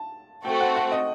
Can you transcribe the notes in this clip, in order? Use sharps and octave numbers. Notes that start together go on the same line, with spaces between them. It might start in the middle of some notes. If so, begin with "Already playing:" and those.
Already playing: A5
A3 C4 F#4 A4 G5
F#5
F#5
D#5